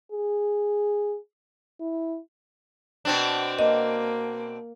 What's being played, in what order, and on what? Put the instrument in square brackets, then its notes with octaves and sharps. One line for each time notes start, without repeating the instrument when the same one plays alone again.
[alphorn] G#4
E4
[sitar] B2 C4 D4
[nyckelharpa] A#3 [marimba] D#5